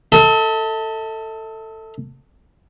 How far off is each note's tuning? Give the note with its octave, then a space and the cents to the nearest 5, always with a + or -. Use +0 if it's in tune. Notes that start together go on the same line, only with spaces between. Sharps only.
A4 +15 E5 -45